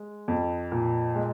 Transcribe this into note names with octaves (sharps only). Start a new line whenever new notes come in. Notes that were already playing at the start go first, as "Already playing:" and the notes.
Already playing: G#3
F2
A#2
G#3